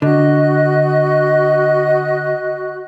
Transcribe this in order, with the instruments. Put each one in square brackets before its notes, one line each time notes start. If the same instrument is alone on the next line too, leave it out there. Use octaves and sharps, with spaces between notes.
[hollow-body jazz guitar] D3 [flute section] F#4 D#5 F#6